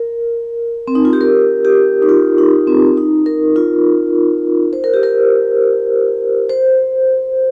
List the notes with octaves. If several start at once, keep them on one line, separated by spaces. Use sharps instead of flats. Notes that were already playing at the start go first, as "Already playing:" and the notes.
Already playing: A#4
C4
D#4
F4
G4
A#4
G4
D#4
F4
D#4
C4
D#4
A#4
F4
C5
A#4
G4
A#4
C5